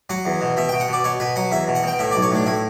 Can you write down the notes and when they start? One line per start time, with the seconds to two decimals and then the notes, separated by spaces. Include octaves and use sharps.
0.10 F#3 F#5
0.25 E2
0.41 B2
0.57 B2 E5
0.69 B2 G5
0.80 F#5
0.88 B2 D5
1.04 B2 C#5
1.20 B2 B4
1.36 F#3 F#5
1.51 E2 E5
1.68 B2
1.75 F#5
1.83 B2 G5
1.99 A2 E5
2.11 B1 D5
2.22 C#5
2.31 A2 D4
2.46 A2 E4